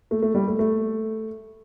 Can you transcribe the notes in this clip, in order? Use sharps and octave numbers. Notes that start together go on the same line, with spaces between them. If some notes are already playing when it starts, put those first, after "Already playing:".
A3
A3
G3
A3
A3